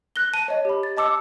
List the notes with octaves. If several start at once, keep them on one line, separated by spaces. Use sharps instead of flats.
F#6 A#6 G7
A5 D#7
C#5 D#5
G4 B5
A6
D#5 A5 D6 E6 C#7